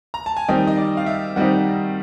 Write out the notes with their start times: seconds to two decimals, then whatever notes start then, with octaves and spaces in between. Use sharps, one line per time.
0.14 A#5
0.26 A5
0.37 G#5
0.48 D#3 G3 C4 D#4 G5
0.67 D#5
0.77 D5
0.97 F5
1.06 E5
1.36 D#3 G3 C4 D#4 F#5